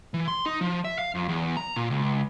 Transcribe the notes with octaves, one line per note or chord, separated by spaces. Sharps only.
E3
C6
D#4
F3
E5
F5
F2
E2
A#5
A#2
C#2